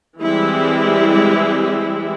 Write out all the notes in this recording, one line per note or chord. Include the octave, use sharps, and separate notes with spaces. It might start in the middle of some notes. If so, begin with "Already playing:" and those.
E3 G3 G#3 C4 E4 G4